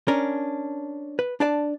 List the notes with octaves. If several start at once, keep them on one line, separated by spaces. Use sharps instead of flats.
C#4 D4 A#4
B4
D4 D5 A5